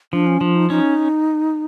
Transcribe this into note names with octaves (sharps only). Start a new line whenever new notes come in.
F3 D4
C#4
F3 D4
D#4
C#4 D#4